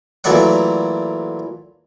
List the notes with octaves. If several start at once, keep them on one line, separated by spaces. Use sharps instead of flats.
A#2 E3 F#3 A3 D5 F#5